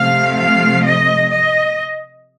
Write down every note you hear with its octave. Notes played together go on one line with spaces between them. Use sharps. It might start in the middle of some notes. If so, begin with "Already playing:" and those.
Already playing: C3 F3 A3 F5
F5
D#5
D#5